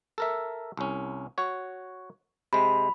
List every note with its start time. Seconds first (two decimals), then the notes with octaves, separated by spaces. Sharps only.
0.18 A4 A#4 E5
0.77 C2 C#4
1.38 F#4 C#5
2.53 C3 G#3 B5